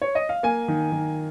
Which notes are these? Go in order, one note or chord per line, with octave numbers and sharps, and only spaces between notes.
C#5
D#5
F5
A#3 G#5
D#3
D#3